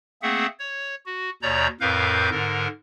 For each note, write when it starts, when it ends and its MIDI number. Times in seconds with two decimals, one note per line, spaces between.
0.23 0.46 57
0.23 0.46 58
0.23 0.46 60
0.23 0.46 68
0.23 0.46 76
0.23 0.46 78
0.59 0.95 73
1.06 1.30 66
1.42 1.68 39
1.42 1.68 47
1.42 1.68 73
1.42 1.68 74
1.42 1.68 82
1.42 1.68 91
1.81 2.30 41
1.81 2.30 45
1.81 2.30 70
1.81 2.30 71
1.81 2.30 77
1.81 2.30 91
2.30 2.68 44
2.30 2.68 50
2.30 2.68 70